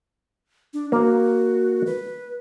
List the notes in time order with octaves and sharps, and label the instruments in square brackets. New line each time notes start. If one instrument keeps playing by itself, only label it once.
[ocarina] D4
[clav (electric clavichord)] A#3 [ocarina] F#4
[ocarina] B4